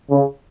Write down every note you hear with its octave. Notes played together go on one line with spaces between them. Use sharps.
C#3